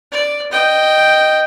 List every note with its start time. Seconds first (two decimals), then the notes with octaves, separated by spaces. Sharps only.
0.12 D5
0.52 D#5 G5